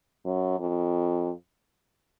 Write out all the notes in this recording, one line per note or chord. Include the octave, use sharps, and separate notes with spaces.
F#2
F2